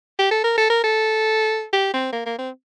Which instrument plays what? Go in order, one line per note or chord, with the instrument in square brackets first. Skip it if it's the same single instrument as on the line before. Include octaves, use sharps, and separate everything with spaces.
[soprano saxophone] G4
A4
A#4
A4
A#4
A4
G4
C4
A#3
A#3
C4